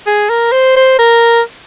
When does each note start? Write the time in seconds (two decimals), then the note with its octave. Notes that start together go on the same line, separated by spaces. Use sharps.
0.06 G#4
0.30 A#4
0.52 C5
0.76 C5
0.99 A#4